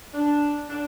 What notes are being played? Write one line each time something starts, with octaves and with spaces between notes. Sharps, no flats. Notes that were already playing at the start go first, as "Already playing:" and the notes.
D4
D4